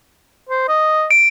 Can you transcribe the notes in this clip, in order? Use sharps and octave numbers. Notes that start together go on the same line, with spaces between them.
C5
D#5
D7